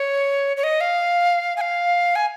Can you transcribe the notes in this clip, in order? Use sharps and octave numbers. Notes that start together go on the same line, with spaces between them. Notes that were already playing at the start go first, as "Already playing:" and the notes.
Already playing: C#5
C#5
D#5
F5
G#5
F5
G#5